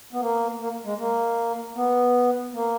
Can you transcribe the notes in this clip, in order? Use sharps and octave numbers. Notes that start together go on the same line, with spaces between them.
B3
A#3
A#3
G#3
A#3
B3
A#3